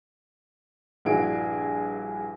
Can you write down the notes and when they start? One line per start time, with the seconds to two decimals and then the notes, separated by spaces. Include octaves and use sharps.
1.05 A#1 G2 E4 F#4 G#4 D7